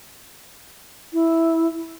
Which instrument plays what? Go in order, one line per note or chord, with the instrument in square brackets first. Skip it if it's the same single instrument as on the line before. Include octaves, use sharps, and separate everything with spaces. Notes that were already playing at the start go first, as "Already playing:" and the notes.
[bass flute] E4